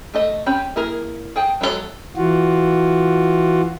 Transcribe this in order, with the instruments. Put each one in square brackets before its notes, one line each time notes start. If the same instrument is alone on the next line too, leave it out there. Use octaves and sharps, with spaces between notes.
[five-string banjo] A3 A4 D#5
C4 C#4 G4 B5
A#3 E4 G#4 A#4
G#4 G5 A5
F#3 G#3 B3 A4 C#5
[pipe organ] E3 F4 F#4